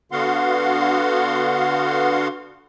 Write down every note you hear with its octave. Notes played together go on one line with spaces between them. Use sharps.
D3 B3 F#4 F5 F#5 C6